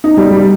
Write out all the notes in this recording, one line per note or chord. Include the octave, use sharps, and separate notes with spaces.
D#4
G3
G3